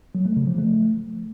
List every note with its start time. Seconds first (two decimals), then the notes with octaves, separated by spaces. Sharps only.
0.15 F#3
0.26 A3
0.36 C#3
0.47 F3
0.58 A3